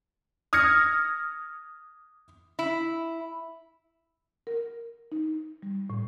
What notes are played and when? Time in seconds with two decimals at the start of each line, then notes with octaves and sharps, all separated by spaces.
0.53 D#6 F6 G#6 A#6 C#7
2.59 E4
4.47 A#4
5.12 D#4
5.62 G3
5.90 A2